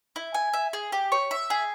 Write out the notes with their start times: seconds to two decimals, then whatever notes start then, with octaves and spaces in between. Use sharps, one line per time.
0.16 E4
0.34 G#5
0.53 E5
0.73 G#4
0.92 G4
1.12 C#5
1.31 E5
1.50 G#4